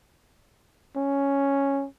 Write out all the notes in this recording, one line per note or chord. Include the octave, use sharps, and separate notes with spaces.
C#4